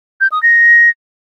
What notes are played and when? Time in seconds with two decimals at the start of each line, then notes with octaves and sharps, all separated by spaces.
0.21 G6
0.32 D#6
0.43 A#6